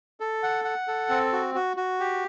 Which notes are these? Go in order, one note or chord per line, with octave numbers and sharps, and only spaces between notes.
A4
F#5
F#5
A4
C4
F#4
F#4
F#4
G4